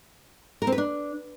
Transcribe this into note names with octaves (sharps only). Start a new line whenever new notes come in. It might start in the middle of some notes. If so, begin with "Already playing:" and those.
A#4
C4
B4
D4